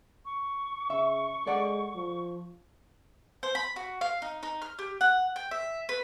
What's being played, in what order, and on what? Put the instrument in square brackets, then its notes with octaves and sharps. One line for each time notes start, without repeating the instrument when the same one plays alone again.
[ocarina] C#6
[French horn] C#3 [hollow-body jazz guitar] E5
[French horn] G#3 [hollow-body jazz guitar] A4 D5 F#5
[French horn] F3
[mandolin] C5
B5
F#4
F5
D#4
D#4
F6
G4
F#5
G5
E5
B4